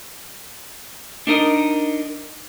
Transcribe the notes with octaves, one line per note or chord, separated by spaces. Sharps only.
D4 D#4 A#4 D#5